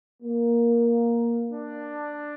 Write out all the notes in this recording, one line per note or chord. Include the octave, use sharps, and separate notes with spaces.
A#3
D4